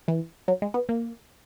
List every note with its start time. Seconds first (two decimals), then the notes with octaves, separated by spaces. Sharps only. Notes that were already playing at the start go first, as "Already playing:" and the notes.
0.08 E3
0.48 F#3
0.62 G#3
0.74 B3
0.89 A#3